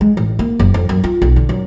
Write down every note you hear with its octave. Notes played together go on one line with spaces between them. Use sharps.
G#3
A1
A#3
F#1
F2
F#2
F4
B1
D3
F#2